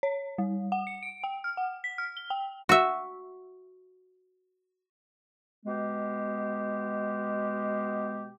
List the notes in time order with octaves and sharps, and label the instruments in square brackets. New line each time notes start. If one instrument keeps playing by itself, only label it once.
[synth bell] C#5
G3
F#5
C#7
D7
G5
F6
F#5
B6
F6
G7
G5
[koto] F#4 E5
[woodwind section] B2 G#3 B3 G4